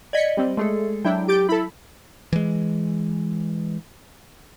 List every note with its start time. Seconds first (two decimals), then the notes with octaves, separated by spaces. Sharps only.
0.13 D5 D#5 G#6 B6 C#7
0.37 G3 C4
0.57 G#3 A3 G#4 A4
1.05 F#3 D4 E4 G5
1.28 G4 G6 A6 D7
1.49 E4 A4 B5
2.33 E3 G#3